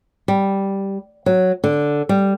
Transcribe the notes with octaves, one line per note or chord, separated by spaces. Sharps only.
G3
F#3
D3
G3